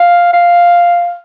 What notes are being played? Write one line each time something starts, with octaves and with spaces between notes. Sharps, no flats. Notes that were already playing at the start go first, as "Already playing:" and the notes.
Already playing: F5
F5